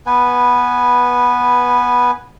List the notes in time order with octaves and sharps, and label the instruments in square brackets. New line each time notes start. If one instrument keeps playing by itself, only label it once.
[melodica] B3 B4 G#5